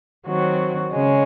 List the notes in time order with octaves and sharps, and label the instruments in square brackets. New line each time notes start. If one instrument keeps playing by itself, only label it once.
[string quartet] D#3 F#3 C4 F#4
C#3 G#3 C#4